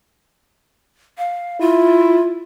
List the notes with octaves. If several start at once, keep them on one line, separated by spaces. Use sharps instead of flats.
F5
E4 F4